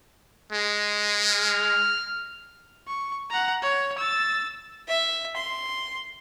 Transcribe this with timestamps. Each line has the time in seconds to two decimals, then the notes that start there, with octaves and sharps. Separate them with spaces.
0.52 G#3
1.31 F6
2.87 C#6
3.30 F#5 A#5
3.62 C#5
3.98 E6 A6
4.88 E5
5.36 C6